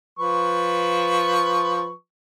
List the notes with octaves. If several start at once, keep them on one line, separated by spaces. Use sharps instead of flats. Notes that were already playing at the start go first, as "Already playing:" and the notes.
F3 B4 C#6